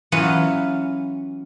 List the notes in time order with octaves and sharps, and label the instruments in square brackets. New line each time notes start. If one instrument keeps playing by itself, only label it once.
[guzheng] E3 F#3 B3 C#4 F4 B4